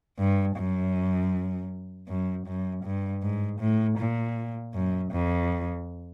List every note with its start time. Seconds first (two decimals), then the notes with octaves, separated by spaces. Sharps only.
0.18 G2
0.57 F#2
2.08 F#2
2.47 F#2
2.84 G2
3.22 G#2
3.60 A2
3.98 A#2
4.74 F#2
5.12 F2